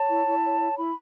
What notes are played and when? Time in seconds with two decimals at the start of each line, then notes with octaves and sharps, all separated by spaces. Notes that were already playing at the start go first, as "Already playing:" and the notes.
Already playing: C#5 A5
0.09 E4
0.26 E4
0.43 C#5
0.60 C#5
0.77 E4 B5